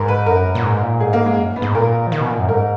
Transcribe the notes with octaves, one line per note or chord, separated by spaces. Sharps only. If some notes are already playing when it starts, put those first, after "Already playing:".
Already playing: G#2 A#4
B4
F#2 A#4
A#2
G#2
A#2
G#2 G#4
A#3
G#3
F#2
G#2
B3
G#2
A#2 A#4
F3
D#3
B2
A#2
F#2
G#2 A#4